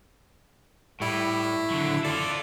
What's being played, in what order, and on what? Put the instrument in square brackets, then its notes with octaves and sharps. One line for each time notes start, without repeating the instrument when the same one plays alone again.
[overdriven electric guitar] A2 [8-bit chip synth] G3 E4
[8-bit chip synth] E4
[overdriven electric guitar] D3 F#3
[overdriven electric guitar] F4 A4 [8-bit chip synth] D5